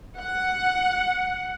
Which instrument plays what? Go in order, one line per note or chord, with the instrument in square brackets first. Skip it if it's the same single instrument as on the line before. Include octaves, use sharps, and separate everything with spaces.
[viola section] F#5